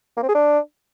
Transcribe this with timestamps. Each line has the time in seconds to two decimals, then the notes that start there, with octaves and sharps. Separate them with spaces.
0.17 A#3
0.23 C4
0.29 G#4
0.35 D4